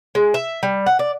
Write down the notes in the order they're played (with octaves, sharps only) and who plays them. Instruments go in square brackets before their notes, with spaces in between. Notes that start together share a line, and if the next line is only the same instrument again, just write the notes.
[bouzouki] G#3
E5
G3
F#5
D5